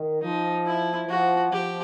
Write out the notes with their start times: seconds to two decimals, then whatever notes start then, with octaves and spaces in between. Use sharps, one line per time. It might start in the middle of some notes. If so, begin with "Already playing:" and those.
Already playing: D#3
0.22 F3 D#4
0.65 E4
1.08 F3 F#4
1.52 F3 G4